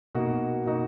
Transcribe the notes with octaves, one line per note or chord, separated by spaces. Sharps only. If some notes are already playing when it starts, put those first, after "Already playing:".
B2 A#3 D#4 F#4
B2 A#3 D#4 F#4